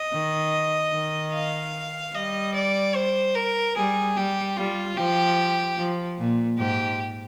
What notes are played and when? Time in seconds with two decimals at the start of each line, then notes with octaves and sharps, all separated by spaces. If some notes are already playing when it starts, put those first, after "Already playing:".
Already playing: D#5
0.13 D#3
0.93 D#3
1.34 F5
2.15 G3 D#5
2.54 D5
2.96 C5
3.35 A#4
3.76 G3 G#4
4.16 G3 G4
4.57 G3 F4
4.97 F3 G4
5.78 F3
6.18 A#2
6.58 G#2 G4